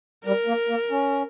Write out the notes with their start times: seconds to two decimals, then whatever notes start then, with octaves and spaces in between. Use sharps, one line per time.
0.25 G3 A#4
0.47 A#3
0.69 A#3
0.90 C#4